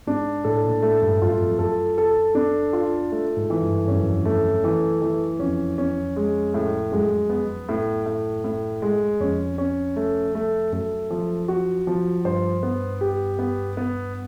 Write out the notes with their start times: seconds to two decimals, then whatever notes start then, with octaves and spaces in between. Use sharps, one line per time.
0.07 G#2 D4
0.26 G#2
0.44 A2 A4
0.64 A#2
0.82 A2 A3
1.02 G2
1.21 F#2 F4
1.40 F2
1.59 F#2 A4
1.98 A4
2.35 D4
2.73 F4
3.12 A3
3.37 G#2
3.50 E3
3.62 G2
3.88 G2 C#4
3.95 F#2
4.03 F2
4.10 F#2
4.25 A3
4.64 E3
5.02 E3
5.39 F2 C#4
5.78 C#4
6.16 G#3
6.54 A2
6.92 F#2 G#3
7.30 B3
7.69 A2
8.06 A2
8.44 A2
8.82 G#3
9.20 F2 C#4
9.58 C#4
9.96 A3
10.35 A3
10.72 F#2 A3
11.10 F3
11.48 F#4
11.87 F3
12.25 G2 C5
12.63 B3
13.01 G4
13.39 B3
13.77 B3